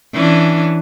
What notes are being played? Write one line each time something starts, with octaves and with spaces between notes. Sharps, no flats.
E3 C#4 D4